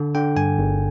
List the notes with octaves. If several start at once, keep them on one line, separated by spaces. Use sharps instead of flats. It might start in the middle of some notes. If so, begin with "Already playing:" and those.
Already playing: D3
D3 G5
G2 G#5
G1